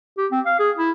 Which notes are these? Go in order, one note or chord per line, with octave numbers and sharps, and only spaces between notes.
G4
C4
F5
G#4
E4